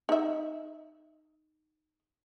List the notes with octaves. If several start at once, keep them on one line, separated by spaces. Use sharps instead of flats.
D#4 E5